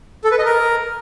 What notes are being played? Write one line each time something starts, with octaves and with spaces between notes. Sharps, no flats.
A4
B4
D#5
A#4